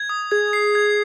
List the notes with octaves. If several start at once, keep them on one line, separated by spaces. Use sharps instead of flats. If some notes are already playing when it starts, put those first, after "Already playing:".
Already playing: G#6
D#6
G#4 G#6
C7
G#6